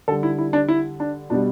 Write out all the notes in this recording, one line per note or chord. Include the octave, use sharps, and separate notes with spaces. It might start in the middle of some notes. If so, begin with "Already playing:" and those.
D3 G3 A4
E4
E4
D4
E4
D4
B2 G3 D4